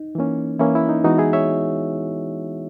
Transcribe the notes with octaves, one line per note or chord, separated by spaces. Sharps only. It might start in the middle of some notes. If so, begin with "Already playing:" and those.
Already playing: D#4
E3 A#3 C#4
E3 A#3 C#4 E4
E4
D#4
E3 G#3 B3 D#4 F#4
E4 G#4
C#5 E5